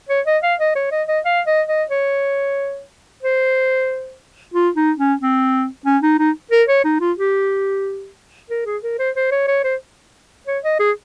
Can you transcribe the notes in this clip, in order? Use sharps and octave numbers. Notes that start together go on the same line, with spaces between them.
C#5
D#5
F5
D#5
C#5
D#5
D#5
F5
D#5
D#5
C#5
C5
F4
D#4
C#4
C4
C#4
D#4
D#4
A#4
C#5
D#4
F4
G4
A#4
G#4
A#4
C5
C5
C#5
C#5
C5
C#5
D#5
G#4